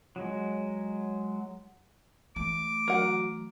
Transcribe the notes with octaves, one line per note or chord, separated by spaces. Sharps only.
F#3 G#3
E3 A3 D6
F#3 A#4 F#5